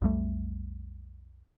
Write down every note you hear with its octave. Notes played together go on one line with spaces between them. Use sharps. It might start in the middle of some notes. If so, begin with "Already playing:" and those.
B1 F2 G3 A3